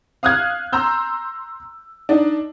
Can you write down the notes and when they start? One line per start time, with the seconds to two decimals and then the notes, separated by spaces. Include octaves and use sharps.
0.23 F5 D#6 F6 F#6 G#6
0.73 A#5 C6 E6 G6
2.09 D4 D#4